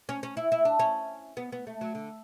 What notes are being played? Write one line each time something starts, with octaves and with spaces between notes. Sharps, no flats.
C#4
C#4
E4
E4
D4
C#4
B3
B3
A3
F#3
D3